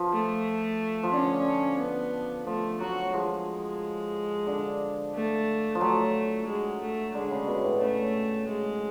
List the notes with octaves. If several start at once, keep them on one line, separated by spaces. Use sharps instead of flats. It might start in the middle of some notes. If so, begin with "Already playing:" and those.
Already playing: F3
A3
F3
D3 C#4
B3
F3 A3
F#3 F#4
F3 G#3
D3
A3
F3
F#3 A3
G#3
A3
D3 G#3
C#3
B2
A2
C#3 A3
G#3